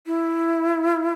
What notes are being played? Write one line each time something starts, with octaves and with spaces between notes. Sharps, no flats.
E4